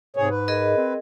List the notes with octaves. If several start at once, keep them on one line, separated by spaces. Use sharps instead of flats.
G#2 C3 G#4 C#5
B4
G#4 A#4 D#5
C4